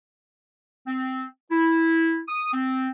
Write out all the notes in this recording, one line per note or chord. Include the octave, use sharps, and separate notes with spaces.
C4
E4
D#6
C4